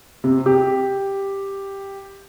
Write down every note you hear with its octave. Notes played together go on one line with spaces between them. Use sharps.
C3
G4